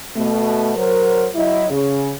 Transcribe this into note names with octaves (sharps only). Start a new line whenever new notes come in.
B2 A3
F#3 A#4 C5
F#3 E4 D#5
C#3